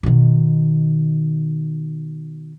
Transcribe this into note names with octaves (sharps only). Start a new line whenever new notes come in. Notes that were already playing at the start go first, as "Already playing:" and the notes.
B2 D#3